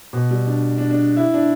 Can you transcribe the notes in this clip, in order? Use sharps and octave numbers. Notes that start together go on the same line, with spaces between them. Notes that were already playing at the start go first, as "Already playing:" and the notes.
B2
G3
D4
D4
D4
E4
D4